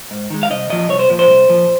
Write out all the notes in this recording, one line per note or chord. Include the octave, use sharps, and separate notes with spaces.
G#2
D#3 G#3
F5
C2 D#5
A#2 F3 D#5
C2 C#5
C5
A#2 F3
C5
C2
A#2 F3